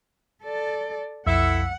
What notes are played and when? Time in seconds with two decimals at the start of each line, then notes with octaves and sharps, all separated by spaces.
0.43 A4 D5
1.26 B1 F2 E4 A4 E5 F#5